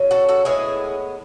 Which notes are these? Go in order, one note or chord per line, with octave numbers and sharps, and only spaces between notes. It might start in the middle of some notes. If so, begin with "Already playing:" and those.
Already playing: C#3 F#3 C#4
F#4 A4
F#4 A4
A2 G#3 B3 E4 G#4